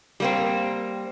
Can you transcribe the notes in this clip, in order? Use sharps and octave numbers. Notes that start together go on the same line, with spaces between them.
G3 A#3 C4